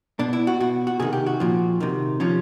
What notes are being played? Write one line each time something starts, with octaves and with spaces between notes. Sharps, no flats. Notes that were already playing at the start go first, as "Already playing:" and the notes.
B2 D4
E4
F#4
B2 F#4
F#4
C3 D#3 G#4
G4
F#4
A#2 F3
C3 D#3
C3 F3 C#4